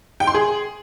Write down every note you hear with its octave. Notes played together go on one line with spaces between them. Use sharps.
G5
C6
G#4